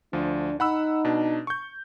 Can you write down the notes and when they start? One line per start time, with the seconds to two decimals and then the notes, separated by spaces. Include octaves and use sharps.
0.13 D2 F3 D4
0.60 D#4 F#5 B5 E6
1.05 B2 D4
1.47 C#6 G6